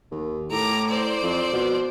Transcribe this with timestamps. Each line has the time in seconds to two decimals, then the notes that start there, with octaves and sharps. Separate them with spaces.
0.12 D#2
0.51 A2 A#5 D6
0.88 C5 D5
1.22 F2
1.53 B2